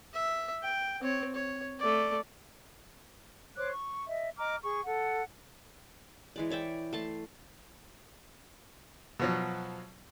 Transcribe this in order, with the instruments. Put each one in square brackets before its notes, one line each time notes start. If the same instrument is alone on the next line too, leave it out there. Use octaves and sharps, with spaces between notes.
[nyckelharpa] E5
G5
C4 C#5
C#5
A3 D5
[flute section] C5 C#5 D6 F#6
C#6
D#5 E5
D#5 A#5 D6 F6
G#4 C#6
A4 F#5
[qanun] E3 G#3 D5
C#5 D5 E5 G5
A3 A5 C6
[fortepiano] B2 F3 F#3